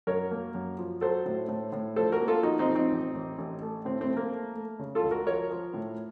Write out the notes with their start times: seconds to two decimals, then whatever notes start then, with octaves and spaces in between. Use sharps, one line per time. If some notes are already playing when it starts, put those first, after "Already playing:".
0.07 F#2 A#4 C#5
0.31 A#3
0.55 F#2
0.78 F3
1.01 F#3 A4 C5
1.26 A2
1.48 A2
1.72 A2
1.96 F3 A4 C5
2.12 F#4 A#4
2.20 A#3
2.28 F4 A4
2.43 F3 D#4 F#4
2.59 C4 D#4
2.67 A#1
2.75 C4 D#4
2.91 A1
3.15 A1
3.38 A1
3.62 A3
3.85 A2 C4
4.01 C4
4.08 A3
4.17 A#3
4.32 A3
4.56 A3
4.79 C#3
4.95 F4 A4
5.03 C#2
5.11 F#4 A#4
5.27 F3 A#4 C#5
5.51 F3
5.74 A2